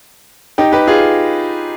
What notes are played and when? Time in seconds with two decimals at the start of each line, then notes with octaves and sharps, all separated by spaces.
0.58 D#4 G4
0.72 G4 B4
0.87 F4 G#4